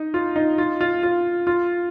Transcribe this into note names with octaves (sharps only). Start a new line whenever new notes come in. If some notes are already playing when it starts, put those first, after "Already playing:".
Already playing: D#4
F4
D#4
F4
F4
F4
F4